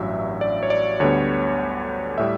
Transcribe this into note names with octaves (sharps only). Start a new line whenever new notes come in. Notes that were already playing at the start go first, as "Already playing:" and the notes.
Already playing: A1 G2 F#3 E5
D5
C#5
D5
D2 D3 G3 B3 C#5
A2 G3 E5